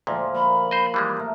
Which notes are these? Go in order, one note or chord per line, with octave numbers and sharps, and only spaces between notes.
D2 A#2 F3 G#3 F4
A#3 B5
C5 D#5
E3 G3 G#3
A3 A#4